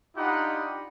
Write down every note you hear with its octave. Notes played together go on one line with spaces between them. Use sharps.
D4 D#4 F4 G4 F#5 B5